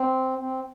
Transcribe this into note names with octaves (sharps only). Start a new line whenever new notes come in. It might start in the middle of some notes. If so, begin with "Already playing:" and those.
Already playing: C4
C4